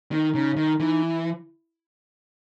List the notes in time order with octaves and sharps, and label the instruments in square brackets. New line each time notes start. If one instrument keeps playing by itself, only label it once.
[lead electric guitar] D#3 [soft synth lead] D#4
[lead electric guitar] C#3 [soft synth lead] D#4
[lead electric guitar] D#3 [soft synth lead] D#4
[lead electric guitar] E3 [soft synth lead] D#4
[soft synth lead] E4